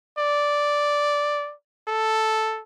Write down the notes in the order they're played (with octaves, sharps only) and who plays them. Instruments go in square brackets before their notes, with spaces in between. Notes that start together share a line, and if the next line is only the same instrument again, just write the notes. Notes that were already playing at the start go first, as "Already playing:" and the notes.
[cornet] D5
A4